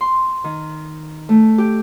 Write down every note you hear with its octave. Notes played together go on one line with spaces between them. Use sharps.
C6
D#3
A3
G4